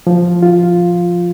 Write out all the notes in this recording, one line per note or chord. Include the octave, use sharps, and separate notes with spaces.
F3
F4